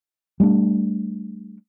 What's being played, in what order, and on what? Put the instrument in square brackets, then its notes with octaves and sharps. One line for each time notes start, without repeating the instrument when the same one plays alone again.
[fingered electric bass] G3 A3 A#3 D4